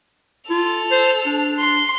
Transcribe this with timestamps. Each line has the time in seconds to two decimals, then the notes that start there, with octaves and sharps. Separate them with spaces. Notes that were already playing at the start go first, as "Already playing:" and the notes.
0.50 F4 A4 F7
0.91 C5
1.26 D4
1.60 C6